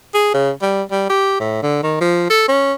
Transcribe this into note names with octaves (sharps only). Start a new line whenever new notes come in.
G#4
C#3
G3
G3
G4
A2
D3
D#3
F3
A4
C#4